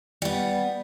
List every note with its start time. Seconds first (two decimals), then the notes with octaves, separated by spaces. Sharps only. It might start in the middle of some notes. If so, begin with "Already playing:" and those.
0.22 G3 B3